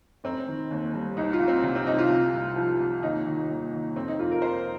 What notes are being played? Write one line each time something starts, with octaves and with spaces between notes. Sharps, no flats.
F1 C4
D#3
D#2
G3
C2 D#4
F4
C2
C4
C3
C4
C2 D#4
F4
C3
C2
F3
C2
D#2 D#4
D#3
D#2
D#2
F2 C4
D#4
F2 F4
A#4
F2 C5